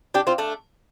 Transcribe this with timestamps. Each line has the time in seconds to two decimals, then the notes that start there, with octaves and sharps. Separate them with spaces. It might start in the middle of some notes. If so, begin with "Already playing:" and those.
0.14 D4 G4
0.27 C4 F4
0.38 A3 D4